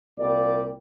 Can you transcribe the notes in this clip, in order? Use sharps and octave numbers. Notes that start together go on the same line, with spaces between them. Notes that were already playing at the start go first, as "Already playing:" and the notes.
C2 A#2 G3 A#3 D5